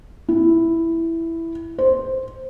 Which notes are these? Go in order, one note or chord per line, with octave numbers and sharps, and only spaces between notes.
E4
C5